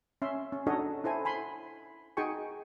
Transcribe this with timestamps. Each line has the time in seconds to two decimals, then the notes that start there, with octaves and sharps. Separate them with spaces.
0.22 C#4 E5 C6
0.52 C#4
0.67 D4 D#4 F#4 A4 C#5 D#5
1.04 E4 A4 C5 G#5
1.25 G#5 B5 C6
2.17 D#4 F#4 G#4 G5 G#5 C#6